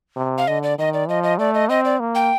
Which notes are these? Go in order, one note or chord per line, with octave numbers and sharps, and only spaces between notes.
C3
F5
D3 D#5
D5
D#3 D#5
D5
F3 D#5
D#5
A3 D5
D#5
C4 D#5
D5
A#3
G5